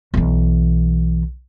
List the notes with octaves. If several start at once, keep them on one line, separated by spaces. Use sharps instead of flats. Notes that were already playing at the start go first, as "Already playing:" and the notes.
B1 E3